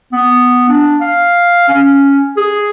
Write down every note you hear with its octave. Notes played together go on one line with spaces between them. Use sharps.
B3
D4
F5
C#4
G#4